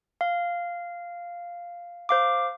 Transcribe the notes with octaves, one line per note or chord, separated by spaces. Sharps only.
F5
C5 F5 D6